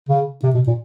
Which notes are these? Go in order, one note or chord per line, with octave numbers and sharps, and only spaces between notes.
C#3
C3
B2
A#2